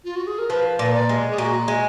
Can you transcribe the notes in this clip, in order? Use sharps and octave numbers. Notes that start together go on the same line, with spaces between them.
F4
F#4
G#4
A#4
F3 B4
A#2 B4
D5
G#3
G#4
A#2 F#4
G#3